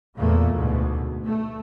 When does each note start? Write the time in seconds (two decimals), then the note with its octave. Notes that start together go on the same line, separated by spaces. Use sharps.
0.17 E2 A#2 A3 A#3
0.53 D2 G#2 B2
1.24 A3